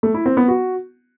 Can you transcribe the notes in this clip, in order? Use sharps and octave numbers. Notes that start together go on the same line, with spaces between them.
A3
E4
C4
B3
F#4